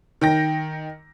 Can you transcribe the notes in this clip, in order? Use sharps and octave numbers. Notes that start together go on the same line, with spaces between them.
D#3 G5 A#6